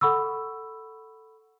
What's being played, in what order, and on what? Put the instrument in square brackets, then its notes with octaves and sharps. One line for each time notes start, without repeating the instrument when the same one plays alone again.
[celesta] A4 F#5 B5 C#6 E6